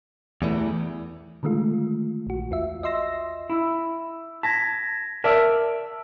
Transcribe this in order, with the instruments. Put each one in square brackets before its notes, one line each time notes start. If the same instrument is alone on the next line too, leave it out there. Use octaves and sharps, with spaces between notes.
[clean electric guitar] E2 [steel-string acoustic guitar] E3 G3 A3
[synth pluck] D3 D#3 G#3 A3 F4
A#1 F#4
E2 F4 E5
D#5 E5 C6 E6 A#6
[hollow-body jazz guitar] E4 [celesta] B5 E6
[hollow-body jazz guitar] A5 [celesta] G#6 A#6 B6
[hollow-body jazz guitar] A#4 D5 E5 [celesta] A5 E6